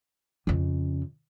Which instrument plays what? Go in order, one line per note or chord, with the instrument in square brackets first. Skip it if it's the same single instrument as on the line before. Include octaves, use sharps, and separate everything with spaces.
[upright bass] F2 C#3